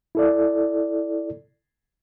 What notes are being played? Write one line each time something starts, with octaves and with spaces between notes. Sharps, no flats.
E4 A4 D5